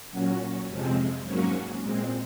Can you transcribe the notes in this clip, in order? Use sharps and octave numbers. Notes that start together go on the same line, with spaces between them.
A#2 F#3 C#4 F#4
F2 C3 F3 G#3 C4
G#2 F#3 A#3 C#4 F#4
A#2 G#3 C4